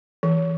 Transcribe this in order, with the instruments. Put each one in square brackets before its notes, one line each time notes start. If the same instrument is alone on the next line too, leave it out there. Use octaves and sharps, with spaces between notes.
[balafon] E3